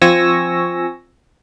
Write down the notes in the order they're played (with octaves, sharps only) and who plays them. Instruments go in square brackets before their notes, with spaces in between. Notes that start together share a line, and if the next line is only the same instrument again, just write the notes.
[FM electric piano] F3 C4 G#5 C#6 E6 A#6